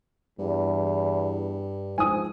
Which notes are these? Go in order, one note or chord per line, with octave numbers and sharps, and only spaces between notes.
E2 G2
G#2 F3 G#5 D#6